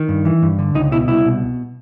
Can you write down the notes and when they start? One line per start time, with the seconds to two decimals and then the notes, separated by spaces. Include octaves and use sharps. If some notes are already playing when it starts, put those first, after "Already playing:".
Already playing: D#3
0.09 G2
0.25 E3
0.42 G2
0.59 D3
0.74 C#2 D#4
0.92 B2 E4
1.08 C2 E4
1.25 B2